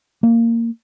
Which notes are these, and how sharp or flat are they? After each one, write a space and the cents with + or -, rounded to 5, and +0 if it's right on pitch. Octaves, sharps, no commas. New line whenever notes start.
A#3 -15